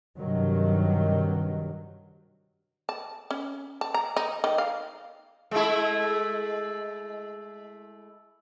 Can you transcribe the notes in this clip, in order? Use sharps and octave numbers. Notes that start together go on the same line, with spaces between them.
G2 C3 D#3 F#3
A5
C#4
A5
A#5
D#4
D#3
F5
G#3 A3 E4